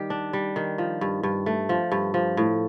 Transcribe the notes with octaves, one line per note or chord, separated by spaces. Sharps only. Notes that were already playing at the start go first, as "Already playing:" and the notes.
Already playing: D#3 G3 G4
D4
G3
D#3
F3
G2
G2
A3
F3
G2
F3
A2